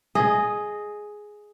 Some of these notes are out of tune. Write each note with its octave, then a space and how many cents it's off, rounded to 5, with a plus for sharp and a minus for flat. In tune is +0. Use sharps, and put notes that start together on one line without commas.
G#4 +5 D#5 -10